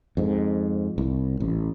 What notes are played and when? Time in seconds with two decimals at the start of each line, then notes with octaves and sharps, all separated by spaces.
0.17 F2 G#2
0.98 C2
1.40 A1